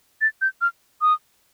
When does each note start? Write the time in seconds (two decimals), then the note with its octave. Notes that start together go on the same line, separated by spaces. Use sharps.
0.21 A6
0.41 G6
0.61 F6
1.01 D#6